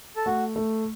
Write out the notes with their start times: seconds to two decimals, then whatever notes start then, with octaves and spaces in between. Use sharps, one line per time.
0.16 A4
0.26 A3 F#4
0.56 A3